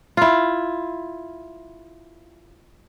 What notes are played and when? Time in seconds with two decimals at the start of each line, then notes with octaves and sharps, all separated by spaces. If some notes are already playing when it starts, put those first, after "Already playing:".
0.17 E4 F4